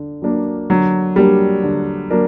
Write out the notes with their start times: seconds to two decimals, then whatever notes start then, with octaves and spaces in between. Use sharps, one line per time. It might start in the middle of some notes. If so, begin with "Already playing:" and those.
Already playing: D3
0.22 F#3 A#3 D4 A#4
0.70 D3 F#3
1.16 F#3 G3 A#3 D4 A#4
1.63 D3
2.10 F#3 A#3 D4 A#4